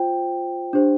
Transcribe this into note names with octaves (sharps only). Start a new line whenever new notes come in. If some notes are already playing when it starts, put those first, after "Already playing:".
Already playing: F4 C5 G5
D4 G4 C5